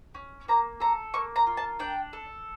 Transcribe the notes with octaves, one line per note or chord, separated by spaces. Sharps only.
C#4
A#3 A#5
A4 A#5
A#3 C#6
A#5
F4
A5
D4 G5
A4